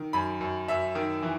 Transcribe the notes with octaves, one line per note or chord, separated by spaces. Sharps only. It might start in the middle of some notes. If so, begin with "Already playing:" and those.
Already playing: D#3
F#2 B5
F#2
F#2 E5
D#3
E3